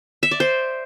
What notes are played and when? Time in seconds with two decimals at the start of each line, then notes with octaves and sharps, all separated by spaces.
0.23 E5
0.31 D5
0.40 C5